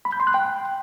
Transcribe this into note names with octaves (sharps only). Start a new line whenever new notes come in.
B5
G6
C6
F#6
G5